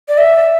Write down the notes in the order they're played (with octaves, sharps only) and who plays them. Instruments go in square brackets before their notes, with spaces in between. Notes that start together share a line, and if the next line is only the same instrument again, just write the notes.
[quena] D5
E5